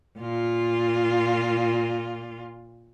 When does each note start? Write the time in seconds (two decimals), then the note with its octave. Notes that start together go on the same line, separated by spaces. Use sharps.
0.19 A#2 F4